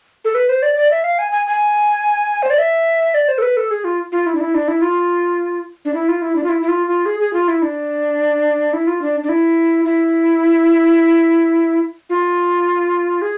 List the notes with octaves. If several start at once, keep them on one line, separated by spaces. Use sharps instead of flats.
A4
B4
C5
D5
D5
E5
F5
G#5
G#5
G#5
C5
D5
E5
D5
C5
A4
B4
A4
G#4
F4
F4
E4
D4
E4
D4
E4
F4
D4
E4
F4
E4
D4
F4
E4
E4
F4
F4
G#4
G#4
F4
E4
D4
E4
F4
D4
D4
E4
E4
F4
G#4